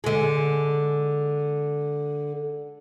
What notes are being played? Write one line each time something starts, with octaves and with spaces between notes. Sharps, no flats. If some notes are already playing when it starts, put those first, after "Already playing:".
D3 G#3